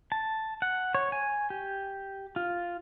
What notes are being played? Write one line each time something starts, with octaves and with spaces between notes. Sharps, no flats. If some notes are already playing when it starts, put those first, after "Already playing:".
A5
F#5
C#5
G#5
G4
F4